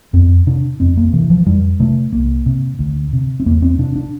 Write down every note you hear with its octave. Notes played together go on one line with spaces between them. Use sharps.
F2 C4
C3 D4
F2 C4
A#3
C3 E3
F3
F2 G3
C3 A3
C2 A#3
C3
D2
C3
C4
E2 A#3
C4
C3 D4
D4